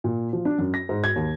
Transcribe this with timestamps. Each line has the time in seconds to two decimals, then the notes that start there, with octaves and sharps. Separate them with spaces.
0.04 A#2
0.33 F3
0.45 D4
0.59 F#2
0.74 A#6
0.89 G#2
1.04 G#6
1.16 D#2